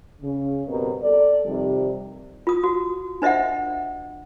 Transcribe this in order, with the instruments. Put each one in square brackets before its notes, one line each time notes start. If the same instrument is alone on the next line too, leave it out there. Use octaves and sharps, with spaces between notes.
[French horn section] C#3
G2 B2 G3 C4 A#4
A4 D5
F2 C3 D#3 G3
[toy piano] F4 D#6
F#4
D4 C5 D#5 E5 F#5